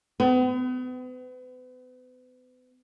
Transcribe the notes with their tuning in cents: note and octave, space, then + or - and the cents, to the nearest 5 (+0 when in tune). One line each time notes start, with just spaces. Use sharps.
B3 +40